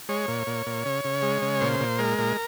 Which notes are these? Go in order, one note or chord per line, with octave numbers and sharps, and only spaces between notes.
G#3 C#5
A#2
A#2
A#2
C#3
C#3
G#3
C#3
A#2 C5
A#2
G#3 A#4
A#2